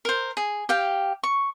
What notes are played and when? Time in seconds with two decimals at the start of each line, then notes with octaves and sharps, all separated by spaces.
0.05 A#4 C5
0.37 G#4
0.69 G4 F5 G5
1.23 C#6